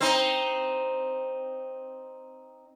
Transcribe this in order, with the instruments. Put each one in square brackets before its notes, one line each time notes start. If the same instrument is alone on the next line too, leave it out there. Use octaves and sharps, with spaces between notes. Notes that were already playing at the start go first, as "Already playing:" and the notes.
[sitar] C4 D#4